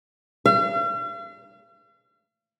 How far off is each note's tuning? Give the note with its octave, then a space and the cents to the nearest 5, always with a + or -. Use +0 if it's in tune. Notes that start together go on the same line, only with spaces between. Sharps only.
F5 -45